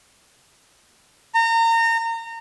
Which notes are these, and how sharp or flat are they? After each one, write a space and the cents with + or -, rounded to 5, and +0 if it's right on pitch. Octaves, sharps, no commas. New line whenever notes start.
A#5 -30